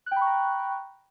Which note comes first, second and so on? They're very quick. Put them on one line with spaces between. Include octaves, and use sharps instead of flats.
F#6 G5 B5 C#6 A#5